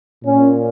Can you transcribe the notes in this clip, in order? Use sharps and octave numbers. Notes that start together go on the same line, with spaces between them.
A#2 C#4